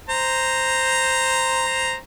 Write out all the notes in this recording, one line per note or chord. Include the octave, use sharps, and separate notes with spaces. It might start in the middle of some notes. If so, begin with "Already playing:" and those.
C5 A#5